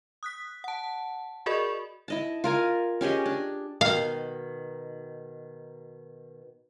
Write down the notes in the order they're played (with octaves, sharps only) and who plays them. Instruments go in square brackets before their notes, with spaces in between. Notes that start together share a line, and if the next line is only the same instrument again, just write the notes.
[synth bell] D#6 F#6 B6
F#5 A5
F#4 G#4 A#4 D5 D#5 B5
[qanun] E4 D#5 A5
F4 A#4 G#5
C#4 G4 G#4 D#5
D4
[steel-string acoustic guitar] B2 D#3 [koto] F5